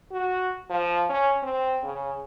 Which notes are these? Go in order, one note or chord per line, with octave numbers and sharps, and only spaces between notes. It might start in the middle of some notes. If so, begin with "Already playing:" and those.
F#4
F3
C#4
C4
C#3